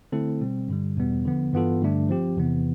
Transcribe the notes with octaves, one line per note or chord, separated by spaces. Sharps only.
D3 A3 C4 E4 A4
B2 G3 C4
G2 D3 G3
E2 B2 G3 B3
D3 F3 B3
G2 E3 B3 F4 A4
G2 D3 A3 D4
F3 C4 G4
E2 C3 E3 B3